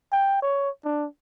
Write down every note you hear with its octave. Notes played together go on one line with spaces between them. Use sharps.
G5
C#5
D4